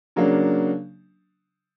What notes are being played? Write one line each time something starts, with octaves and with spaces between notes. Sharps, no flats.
C#3 F#3 A#3 D4